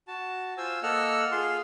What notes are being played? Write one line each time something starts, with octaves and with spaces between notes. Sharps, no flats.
F#4 A5
F4 C5 G#5 E6
A#3 A4 D#5 F#5 E6 F6
F4 G#4 F5 C6